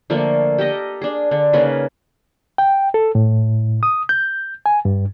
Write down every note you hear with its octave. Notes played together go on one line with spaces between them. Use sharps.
D3 F3 A3 A#3
G4 A4 A#4 D#5
D4 G#4
D3
C#3 A#3 D#4 B4
G5
A4
A2
D#6
G6
G#5
G2